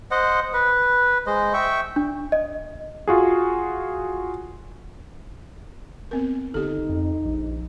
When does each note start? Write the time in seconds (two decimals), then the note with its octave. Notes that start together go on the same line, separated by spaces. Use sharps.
0.11 C5 D#5 F#5
0.53 B4
1.27 G#3 C5 D#5
1.54 E5 G5 C#6
1.96 D4
2.32 D#5
3.08 F4 F#4 G#4
6.11 B3 C4 A#4
6.54 G1 D#4 G4 A4
6.89 F2
7.25 A#1